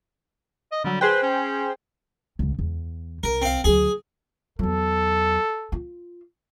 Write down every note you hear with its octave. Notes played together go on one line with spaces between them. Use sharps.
D#5
D3 F#3 G3
G#4 B4 C5 G5
C#4
C#2 C#3
E2
C2 A#4
C4 F5
D2 F#3 G#4
E2 F#3 A4
F4